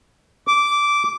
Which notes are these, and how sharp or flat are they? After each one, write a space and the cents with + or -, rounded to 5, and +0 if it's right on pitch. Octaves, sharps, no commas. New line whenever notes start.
D6 -10